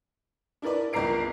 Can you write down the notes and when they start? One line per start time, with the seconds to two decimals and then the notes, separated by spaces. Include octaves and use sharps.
0.62 D4 E4 A#4 B4 D5
0.93 G1 C#2 A#4 A#5 C7 D7